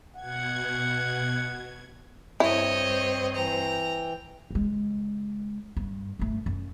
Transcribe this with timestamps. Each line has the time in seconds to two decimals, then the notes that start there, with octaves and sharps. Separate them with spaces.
0.16 B2 F#5 G#6
2.40 G2 C4 E4 C#5 D#5
3.35 E3 G5 A#5
4.51 C#3 G#3
5.77 G2
6.19 G2 A3
6.46 F#2